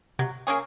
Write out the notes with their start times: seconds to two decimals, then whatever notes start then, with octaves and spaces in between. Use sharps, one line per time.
0.19 C3 F#3
0.47 A#3 C#4 G#4